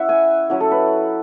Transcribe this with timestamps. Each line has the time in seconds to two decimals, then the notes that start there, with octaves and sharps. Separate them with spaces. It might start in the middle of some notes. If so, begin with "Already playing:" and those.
Already playing: C#4 E4 E5 F#5
0.09 G#5
0.50 F#3 C#4 E4 F#5
0.60 A4
0.71 B4